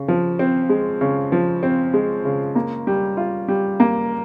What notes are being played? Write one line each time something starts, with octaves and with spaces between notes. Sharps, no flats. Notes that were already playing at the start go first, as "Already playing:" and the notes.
Already playing: C#3
F3
C4
G#3
C#3
F3
C4
G#3
C#3
A#3
G3
F4
G3
A#3